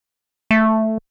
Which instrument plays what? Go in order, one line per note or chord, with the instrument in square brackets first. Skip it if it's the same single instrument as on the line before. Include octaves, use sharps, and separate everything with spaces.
[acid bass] A3